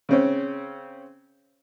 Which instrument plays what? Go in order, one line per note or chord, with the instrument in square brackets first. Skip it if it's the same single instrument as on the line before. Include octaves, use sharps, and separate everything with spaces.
[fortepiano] C#3 C4 C#4